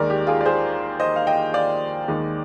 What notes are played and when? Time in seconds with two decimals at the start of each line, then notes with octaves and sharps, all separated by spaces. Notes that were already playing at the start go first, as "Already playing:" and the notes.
Already playing: D#2 D#3 G#3 A#4 D5
0.10 G4
0.27 F4 G#4
0.41 D5
0.46 G#4 C5
1.00 C5 D#5
1.16 F5
1.27 D#5 G5
1.54 D5 F5
2.08 D#2 D#3 G#3 D#4